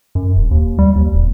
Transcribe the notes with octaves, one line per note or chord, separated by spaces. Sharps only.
F#2
D#1
D#2
G3
D#2
D1